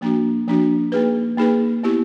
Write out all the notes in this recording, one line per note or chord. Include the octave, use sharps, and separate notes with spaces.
F3 A#3 D4 F#4
F3 A#3 D4 F#4
A#3 D#4 G#4 B4
A#3 D#4 G#4 B4
B3 E4 G4